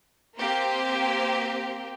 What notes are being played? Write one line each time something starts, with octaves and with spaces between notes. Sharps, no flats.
A#3 C4 G4